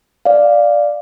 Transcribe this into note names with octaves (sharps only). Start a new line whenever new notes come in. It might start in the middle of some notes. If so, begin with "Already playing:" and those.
D5 F5